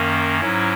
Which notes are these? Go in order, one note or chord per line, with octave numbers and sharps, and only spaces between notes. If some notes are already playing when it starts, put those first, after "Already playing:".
Already playing: F#2 D#3 A#3 C#4
G#2 F#3 C#4 E4